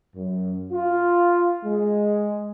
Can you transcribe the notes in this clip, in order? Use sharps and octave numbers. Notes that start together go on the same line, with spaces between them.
F#2
F4
G#3